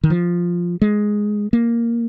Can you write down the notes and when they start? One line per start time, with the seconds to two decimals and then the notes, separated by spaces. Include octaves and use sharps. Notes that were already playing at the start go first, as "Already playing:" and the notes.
0.04 D#3
0.10 F3
0.82 G#3
1.53 A#3